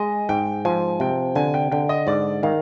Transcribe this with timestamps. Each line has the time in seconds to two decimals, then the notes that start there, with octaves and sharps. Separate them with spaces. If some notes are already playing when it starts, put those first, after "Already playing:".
Already playing: G#3 D#5
0.29 G#2 G5
0.65 F3 G#5
1.00 C3 G5
1.35 D3 G#5
1.54 G5
1.72 D3 G5
1.89 D#5
2.07 G#2 D5
2.43 D#3 F5